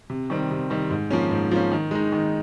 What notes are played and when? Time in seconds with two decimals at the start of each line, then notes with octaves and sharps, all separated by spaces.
0.10 C3
0.30 D#3 G3 C4
0.51 C3
0.70 D#3 G3 C4
0.90 G#2
1.11 F3 A#3 C#4
1.31 G#2
1.51 F3 A#3 C#4
1.72 D#3
1.91 G#3 D#4
2.12 D#3